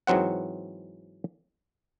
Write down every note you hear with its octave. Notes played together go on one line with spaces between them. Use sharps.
G#2 E3 F#3 C4 F#5